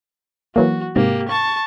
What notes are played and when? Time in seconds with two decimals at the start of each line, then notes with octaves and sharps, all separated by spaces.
0.56 E3 F#3 A#3 F#4
0.96 G#2 C3 A#3 G4
1.29 A5 C#6